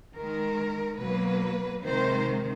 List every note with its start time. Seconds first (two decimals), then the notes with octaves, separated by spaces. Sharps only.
0.15 D#3 G#3 A#4
0.98 B2 F#3 A#3 B4
1.83 C3 D#3 G#3 C5